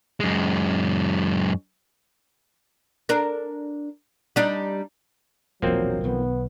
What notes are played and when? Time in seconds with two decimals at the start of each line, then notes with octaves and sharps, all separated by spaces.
0.20 F#2 G#3
3.09 D4 A#4
4.36 G3 D4 D#4
5.62 E1 A#1 F3 F#3 A#3 C4
6.04 B1 D#3 B3